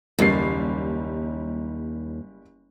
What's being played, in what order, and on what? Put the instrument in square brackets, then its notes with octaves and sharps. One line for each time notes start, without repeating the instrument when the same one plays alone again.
[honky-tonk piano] F#1 G3 C7 [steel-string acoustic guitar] D#2